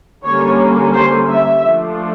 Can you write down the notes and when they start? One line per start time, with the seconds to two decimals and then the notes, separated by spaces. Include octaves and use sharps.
0.24 D3 G3 A#3 C#4 C#5
0.93 C5
1.29 E5
1.63 F3 A3 D4